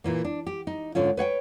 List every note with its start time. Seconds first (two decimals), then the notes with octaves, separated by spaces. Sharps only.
0.04 A#2 E3 A#3
0.25 D4
0.47 G4
0.67 D#4
0.95 G#2 D3 C#4 F4
1.17 B4 C#5 F#5 G5